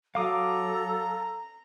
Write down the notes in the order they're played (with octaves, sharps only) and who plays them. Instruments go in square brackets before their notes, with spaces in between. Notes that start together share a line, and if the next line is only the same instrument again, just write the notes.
[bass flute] F#3 [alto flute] A4 [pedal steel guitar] F5 D6 D#6 [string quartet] A#5